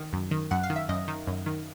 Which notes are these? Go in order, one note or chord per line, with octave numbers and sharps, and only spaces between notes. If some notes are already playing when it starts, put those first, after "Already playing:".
Already playing: D#3
F#2
D#3
F#2 F#5
F5
D#3
E5
F#2 D#5
D#3
F#2
D#3